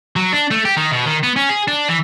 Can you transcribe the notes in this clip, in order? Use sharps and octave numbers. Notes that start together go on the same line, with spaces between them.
F#3
D4
A3
G4
D#3
B2
D#3
B3
C#4
G#4
D4
E3